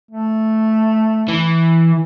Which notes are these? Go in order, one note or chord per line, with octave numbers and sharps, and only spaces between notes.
A3
E3